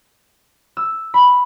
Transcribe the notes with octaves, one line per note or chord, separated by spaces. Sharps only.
E6
B5